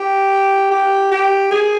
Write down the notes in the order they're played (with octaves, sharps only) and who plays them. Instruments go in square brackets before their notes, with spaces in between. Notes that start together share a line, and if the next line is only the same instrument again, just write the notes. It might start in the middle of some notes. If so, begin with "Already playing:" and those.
Already playing: [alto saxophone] G4
G4
G4
G#4